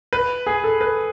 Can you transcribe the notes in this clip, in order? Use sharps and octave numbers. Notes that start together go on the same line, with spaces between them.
B4
G#4
A4
B4